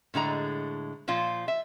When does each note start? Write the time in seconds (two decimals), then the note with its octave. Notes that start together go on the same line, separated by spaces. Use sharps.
0.14 A2 D3 G#3 A#5
1.08 A#2 F3 F4
1.48 E5